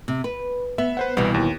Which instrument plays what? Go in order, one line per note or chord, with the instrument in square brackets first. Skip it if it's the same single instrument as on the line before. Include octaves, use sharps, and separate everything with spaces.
[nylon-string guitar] C3
B4
[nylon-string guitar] B3 [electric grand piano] E5
[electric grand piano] B4 C5 F#5
[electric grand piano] C2 B3 [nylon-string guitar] B2 E3 G3
[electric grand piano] D#2